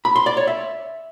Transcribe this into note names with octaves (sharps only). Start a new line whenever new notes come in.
B5
C6
D5
C#5
E5